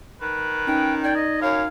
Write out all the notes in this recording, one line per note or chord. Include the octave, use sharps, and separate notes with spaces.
D#3 B4
C#4 D#4 G5
D#4 D5 G5 G#6
D#5
F#2 C#5 F5